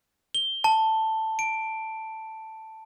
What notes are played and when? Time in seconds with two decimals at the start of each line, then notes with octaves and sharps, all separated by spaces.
0.35 G7
0.64 A5
1.39 D7